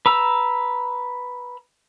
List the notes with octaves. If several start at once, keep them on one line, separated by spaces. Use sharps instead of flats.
B4 A#5 E6